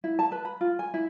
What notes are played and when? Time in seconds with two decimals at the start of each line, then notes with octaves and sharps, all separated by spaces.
0.04 E4
0.19 A5
0.32 B4
0.45 B5
0.61 F4
0.79 G#5
0.94 E4